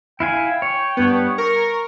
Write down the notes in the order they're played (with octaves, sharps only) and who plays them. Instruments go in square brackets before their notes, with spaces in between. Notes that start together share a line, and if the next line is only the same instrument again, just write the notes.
[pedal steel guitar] E4 F5 G#5 [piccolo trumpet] G5
[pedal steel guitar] C#5
[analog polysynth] G2 B3
[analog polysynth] A#4 [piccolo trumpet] C#6